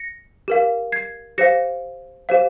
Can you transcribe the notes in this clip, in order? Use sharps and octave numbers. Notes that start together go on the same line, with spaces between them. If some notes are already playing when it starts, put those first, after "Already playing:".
Already playing: A#6 C#7
G4 A#4 F5
G#6 C7
G4 C5 F5 A#6 C#7
G4 C5 F5